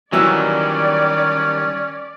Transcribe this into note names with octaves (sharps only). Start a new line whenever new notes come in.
D#3 E3 F#3 G3 C#4 D5 E6